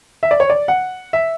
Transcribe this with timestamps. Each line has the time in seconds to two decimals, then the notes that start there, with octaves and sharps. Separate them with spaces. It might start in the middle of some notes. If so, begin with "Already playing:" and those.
0.23 E5
0.31 D5
0.40 C#5
0.50 D5
0.68 F#5
1.13 E5